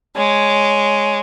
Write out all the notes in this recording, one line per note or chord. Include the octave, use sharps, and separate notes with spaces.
G#3 C#5